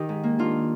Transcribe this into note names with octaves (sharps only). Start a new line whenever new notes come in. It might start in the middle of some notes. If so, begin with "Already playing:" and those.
Already playing: D#3 D#4 G4
G#2
A#3
D#3 D4 F4